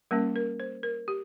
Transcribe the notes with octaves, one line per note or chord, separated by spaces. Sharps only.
G3 A#3 C#4 A#4
A#4
C5
A#4
G4